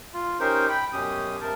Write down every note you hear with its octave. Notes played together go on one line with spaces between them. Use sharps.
F4
C#4 D#4 G4 A#4 C5
G5 B5
F#2 B2 C#4 G4 D#6
G2 C3 A#4 A5